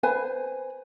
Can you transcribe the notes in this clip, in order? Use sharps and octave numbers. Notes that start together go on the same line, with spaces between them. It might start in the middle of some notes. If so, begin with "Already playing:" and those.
B4 C5 G#5